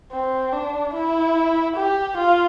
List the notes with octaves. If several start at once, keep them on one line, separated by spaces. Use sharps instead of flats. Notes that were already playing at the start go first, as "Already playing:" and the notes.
C4
D4
E4
G4
F4